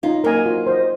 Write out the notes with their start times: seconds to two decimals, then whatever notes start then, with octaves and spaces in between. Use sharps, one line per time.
0.03 C#4 D#4 F4
0.24 F#3 A#3 A#4 D#5 G#5
0.46 F4
0.67 C5 D#5